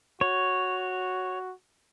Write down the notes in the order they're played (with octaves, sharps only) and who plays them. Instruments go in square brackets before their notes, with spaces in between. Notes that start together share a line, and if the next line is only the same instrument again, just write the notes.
[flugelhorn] F#4 [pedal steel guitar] C#5